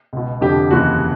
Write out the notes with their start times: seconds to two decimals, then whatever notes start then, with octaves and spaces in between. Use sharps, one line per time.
0.13 C#2 B2
0.41 F1 F2 D3 G4
0.71 F1 D#2 C#3 E3 F#4